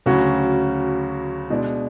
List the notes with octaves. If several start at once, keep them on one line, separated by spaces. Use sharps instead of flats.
D2 C#3 F#3 C#4 F#4
B2 G#3 D4